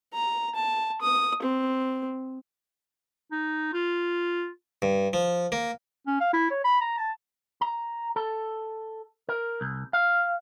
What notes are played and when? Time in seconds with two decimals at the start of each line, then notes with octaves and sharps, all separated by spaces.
0.14 A#5
0.55 A5
1.01 D#6
1.42 C4
3.32 D#4
3.73 F4
4.82 G2
5.13 F3
5.52 A#3
6.07 C#4
6.21 F5
6.33 E4
6.50 C#5
6.64 B5
6.81 A#5
6.98 A5
7.61 A#5
8.16 A4
9.29 A#4
9.61 C2
9.93 F5